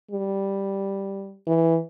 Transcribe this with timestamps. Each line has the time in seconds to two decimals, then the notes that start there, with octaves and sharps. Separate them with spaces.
0.11 G3
1.47 E3